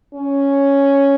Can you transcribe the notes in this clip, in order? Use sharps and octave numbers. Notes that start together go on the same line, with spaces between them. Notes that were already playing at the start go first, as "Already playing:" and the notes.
C#4